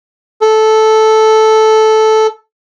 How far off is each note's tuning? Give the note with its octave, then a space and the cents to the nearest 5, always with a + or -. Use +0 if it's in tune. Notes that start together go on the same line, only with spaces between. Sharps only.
A4 -10